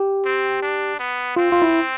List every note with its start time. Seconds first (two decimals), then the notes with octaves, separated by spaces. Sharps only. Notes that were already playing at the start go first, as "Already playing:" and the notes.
Already playing: G4
0.25 C4
0.62 D4
0.99 B3
1.36 C4 F4
1.52 F4
1.62 E4